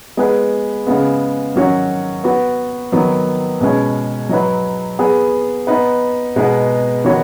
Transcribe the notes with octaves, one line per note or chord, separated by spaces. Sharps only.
G#3 B3 G#4 B4
C#3 G#3 B3
D#3 F#3 C#4 F#4 C#5
B3 F#4 B4
D#3 F#3 B3
B2 G#3 C#4 B4
F#3 D#4 B4
B3 G#4 B4
B3 D#4 B4
B2 G#3 B3 D#4 B4
D#3 B3 F#4 C#5